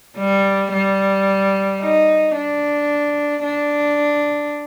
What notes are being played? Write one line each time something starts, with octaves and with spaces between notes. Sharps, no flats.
G3
G3
D#4
D4
D4